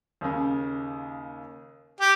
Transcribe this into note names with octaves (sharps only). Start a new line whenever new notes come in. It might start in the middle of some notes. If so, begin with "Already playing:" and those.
D#2 C#3
G4